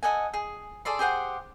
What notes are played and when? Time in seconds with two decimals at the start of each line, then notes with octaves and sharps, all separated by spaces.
0.03 A4 D#5 F#5 G#5
0.33 G#4
0.85 G#4 A4 D5 C6
0.99 G4 G#4 C5 F#5